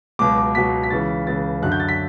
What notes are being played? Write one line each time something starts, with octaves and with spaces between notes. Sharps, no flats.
C#2 B2 F#3 D6
D6
C#2 B2 F#3 B6
B6
C#2 C#3 E3 A6
C#2 C#3 E3 A6
F#2 D3 F#3 F#6
G6
A6
B6